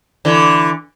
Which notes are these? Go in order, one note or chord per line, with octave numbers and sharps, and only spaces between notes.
D3 E3